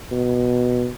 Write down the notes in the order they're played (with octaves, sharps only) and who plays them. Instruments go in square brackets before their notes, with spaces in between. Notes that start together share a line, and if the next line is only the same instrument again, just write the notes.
[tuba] B2